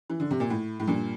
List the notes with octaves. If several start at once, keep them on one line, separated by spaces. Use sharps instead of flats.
E3
D3
C3
A#2
A2
A2
G2 A#2